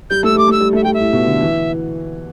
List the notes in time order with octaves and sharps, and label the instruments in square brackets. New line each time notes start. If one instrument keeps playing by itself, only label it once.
[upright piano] G3 [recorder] G6
[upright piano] A3 [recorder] E6
[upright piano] G3 [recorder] D6
[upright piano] A3 [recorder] E6
[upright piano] G3
[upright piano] A3 [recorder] E5
[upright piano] G3 [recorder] G5
[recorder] E5
[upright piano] A2
B2
D3
E3